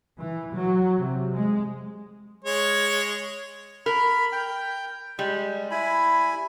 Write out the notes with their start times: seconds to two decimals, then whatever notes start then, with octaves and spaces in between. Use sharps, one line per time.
0.20 E3
0.55 F#3
0.99 C3
1.34 G#3
2.44 G#3 C#5
3.86 A#4 B5
4.32 G5
5.19 G3 G#3
5.71 E4 G#5 B5